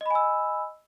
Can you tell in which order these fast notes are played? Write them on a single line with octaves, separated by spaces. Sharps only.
D#5 B5 G#5 E6